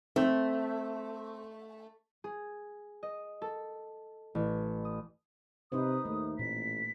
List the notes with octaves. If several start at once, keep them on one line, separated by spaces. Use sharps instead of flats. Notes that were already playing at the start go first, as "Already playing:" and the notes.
A3 C4
G#4
D#5
A4
A1
D#6
C3 D#4 B4 C5 D#6
D#2 A3
A1 A#2 B6